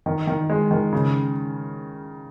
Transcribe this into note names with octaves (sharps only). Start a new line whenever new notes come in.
D#3
D#3
G#3
D#3
C#3